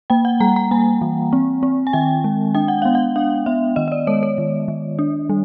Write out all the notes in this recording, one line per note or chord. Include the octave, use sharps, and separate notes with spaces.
A#3 G5
F#5
G3 A#5
A#5
A#3 G#5
E3
C4
C4
G#5
D#3 G5
G#3
D4 G5
F#5
B3 F5
F#5
D4 F5
B3 E5
D#3 D#5
D#5
D5
G#3 C#5
C#5
D#3
D#3
D4
G3